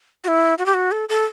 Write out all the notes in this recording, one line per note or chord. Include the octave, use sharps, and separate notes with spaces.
F#4
E4
F#4
G4
F#4
A4
A4